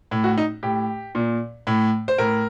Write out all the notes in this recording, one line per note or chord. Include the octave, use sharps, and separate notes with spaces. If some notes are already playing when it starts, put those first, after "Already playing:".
A2
F#4
D#4
A2 G4
A#2
A2
C5
A2 A#4